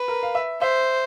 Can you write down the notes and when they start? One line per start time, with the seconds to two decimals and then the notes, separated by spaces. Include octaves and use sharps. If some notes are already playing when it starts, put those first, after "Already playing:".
Already playing: B4
0.08 A#4
0.23 F5
0.35 E5
0.61 C5 E5